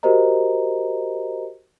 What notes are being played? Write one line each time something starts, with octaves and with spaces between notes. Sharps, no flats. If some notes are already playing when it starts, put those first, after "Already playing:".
F#4 G4 A#4 C5 D#5 A#5